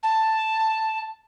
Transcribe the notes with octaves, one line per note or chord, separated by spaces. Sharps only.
A5